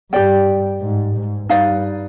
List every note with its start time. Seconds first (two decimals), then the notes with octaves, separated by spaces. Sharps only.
0.12 G2 G4 D5 G5
0.81 G#2
1.16 G#2
1.49 G2 D#4 B4 D5 F5